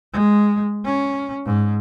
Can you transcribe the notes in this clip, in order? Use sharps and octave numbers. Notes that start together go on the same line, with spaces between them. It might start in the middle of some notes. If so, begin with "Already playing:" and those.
G#3
C#4
G#2